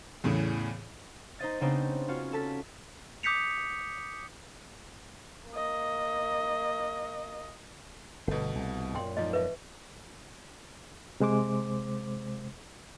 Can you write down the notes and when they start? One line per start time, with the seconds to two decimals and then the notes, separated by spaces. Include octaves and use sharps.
0.24 E2 A2 C#3
1.39 D#4 C5 D#5 A6
1.61 C#3 B3 C4 D4 D#4 C5
2.08 C#4 F4 F#4
2.32 A4 A5 B6
3.23 D6 D#6 G6 B6 C#7 F7
5.50 A#3 D#5
8.28 G1 B2 A3
8.55 C2
8.95 F#2 A#2 G5 C6
9.17 G#2 F3 D#5
9.33 B4 E5
11.20 C3 G#3 C5 D6